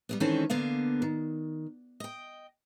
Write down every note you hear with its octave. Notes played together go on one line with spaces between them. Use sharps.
G3 A3 B3
D#3 E3 G#3 C4 C#4 A4
D3 A#3 B3 F5
D#3
D#5 G5